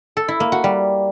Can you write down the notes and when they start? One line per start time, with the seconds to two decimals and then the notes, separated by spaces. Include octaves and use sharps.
0.17 A4
0.28 E4
0.40 A#3
0.52 F#4
0.64 G3